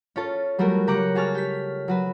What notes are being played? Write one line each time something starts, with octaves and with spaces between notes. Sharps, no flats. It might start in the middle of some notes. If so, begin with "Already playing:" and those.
C#4 F4 A4
F#3 G3 A3 F#4 A#4
C#3 G4 A#5 D6 F#6 C#7
F#4 G#4 C#5 A5 F6
G4 B6
F#3 F#4 B4